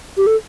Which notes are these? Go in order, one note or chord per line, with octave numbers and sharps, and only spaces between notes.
G4
A4